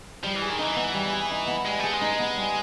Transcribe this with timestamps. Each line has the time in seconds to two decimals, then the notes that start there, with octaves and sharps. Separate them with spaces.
0.24 F3 G3
0.36 E3
0.42 G#4
0.50 D#3
0.59 E3 D#4
0.76 B3
0.94 G3
1.13 G#4
1.30 D#4
1.47 B3
1.65 G3 G#3
1.79 A3 G#4
1.94 G#3
2.01 D#4
2.19 B3
2.37 G3